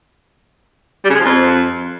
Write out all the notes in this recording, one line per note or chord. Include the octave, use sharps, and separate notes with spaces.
G3
C#3
G#3
F3
F2